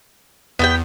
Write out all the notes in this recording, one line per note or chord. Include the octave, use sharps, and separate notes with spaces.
E2 B3 G4 G5